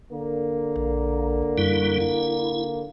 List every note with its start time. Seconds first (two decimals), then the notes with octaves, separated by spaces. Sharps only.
0.12 D3 A#3
0.76 A#1
1.58 F#2 G3 E4
2.00 E4